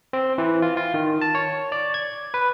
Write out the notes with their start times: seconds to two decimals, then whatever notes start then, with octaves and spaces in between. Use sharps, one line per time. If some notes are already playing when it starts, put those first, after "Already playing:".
0.13 C4
0.38 E3
0.62 F4
0.77 F4
0.94 D#3
1.21 A5
1.35 C#5
1.72 D5
1.94 G#6
2.34 B4